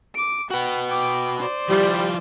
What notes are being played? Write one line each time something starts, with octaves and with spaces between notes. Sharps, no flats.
D6 D7
F#4 B4 F#5 G5
G5 D6
C5 D5
F3 G3 E4 F4